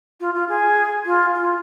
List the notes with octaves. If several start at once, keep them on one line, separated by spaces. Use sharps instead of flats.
F4
F4
G#4
F4
F4